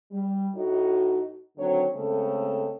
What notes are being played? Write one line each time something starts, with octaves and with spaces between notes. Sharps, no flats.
G3
A2 A3 D#4 F#4
D3 D#3 F#3 C4 C#5
C#3 G#3 A3 C4 C#4 A4